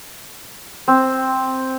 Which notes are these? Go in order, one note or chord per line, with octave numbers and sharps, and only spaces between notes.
C4